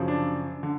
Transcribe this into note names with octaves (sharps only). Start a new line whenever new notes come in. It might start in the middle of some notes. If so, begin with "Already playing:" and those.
Already playing: F#2 C#3 F3
D4
D3